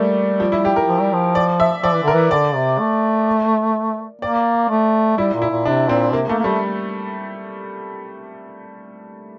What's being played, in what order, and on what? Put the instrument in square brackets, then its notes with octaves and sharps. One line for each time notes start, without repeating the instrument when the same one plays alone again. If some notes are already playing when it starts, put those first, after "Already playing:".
Already playing: [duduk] G3 [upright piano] A3 A#3
[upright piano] F3
E4
G4
A#4
[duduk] F3
G3
F3
[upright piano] D5
E5
[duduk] F3 [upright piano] D5
[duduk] E3
[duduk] D3 [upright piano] A#4
[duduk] E3
[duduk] D3 [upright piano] D5
[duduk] C3
A3
[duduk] A#3 [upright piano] D5
[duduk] A3
[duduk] G3 [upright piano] E4
[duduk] A#2
[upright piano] E4
[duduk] A#2
[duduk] C3 [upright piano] D4
[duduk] A#2 [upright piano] C4
[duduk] C3 [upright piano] A#3
[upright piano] A3 [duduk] A#3
[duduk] A#3
[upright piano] G3 [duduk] A3